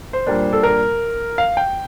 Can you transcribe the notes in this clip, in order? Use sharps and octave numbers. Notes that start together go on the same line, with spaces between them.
C5
A#2 G3 A#3 D4
A4
A#4
F5
G5